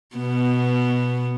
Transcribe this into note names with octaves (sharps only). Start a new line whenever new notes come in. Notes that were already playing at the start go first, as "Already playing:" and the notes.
B2 B3